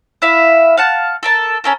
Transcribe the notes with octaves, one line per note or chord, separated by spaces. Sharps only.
E4 E5 F5
F5 F#5 A5
A4 A#4 A5
C#4 A4 A#4